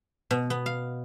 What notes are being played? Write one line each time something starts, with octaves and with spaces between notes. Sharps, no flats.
B2
B3
F5